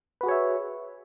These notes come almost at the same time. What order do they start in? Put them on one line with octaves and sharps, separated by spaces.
B4 F#4 G#4 C#5 E5